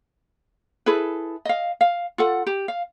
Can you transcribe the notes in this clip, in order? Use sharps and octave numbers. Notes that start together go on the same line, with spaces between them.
E4 G#4 A4 B4
D#5 F5
F5
F4 A4 F#5
G4
F5